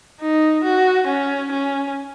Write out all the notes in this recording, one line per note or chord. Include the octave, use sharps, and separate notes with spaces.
D#4
F#4
C#4
C#4